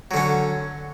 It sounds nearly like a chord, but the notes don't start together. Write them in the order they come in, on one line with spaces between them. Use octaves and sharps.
F#3 D3 C#4